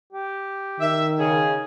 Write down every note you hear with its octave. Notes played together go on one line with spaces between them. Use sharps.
G4
D#3 E5
C#3 G#4